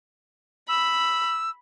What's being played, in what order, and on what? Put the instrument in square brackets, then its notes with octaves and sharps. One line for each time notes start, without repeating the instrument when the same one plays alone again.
[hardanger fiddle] B5 [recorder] E6